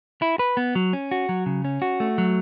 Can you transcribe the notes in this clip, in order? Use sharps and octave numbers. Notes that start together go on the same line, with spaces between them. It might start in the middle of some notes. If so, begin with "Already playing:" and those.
E4
B4
B3
F#3
C#4
F#4
F#3
C#3
C#4
F#4
A3
F#3